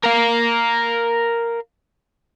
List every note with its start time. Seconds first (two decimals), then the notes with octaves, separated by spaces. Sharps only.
0.04 A#4 F5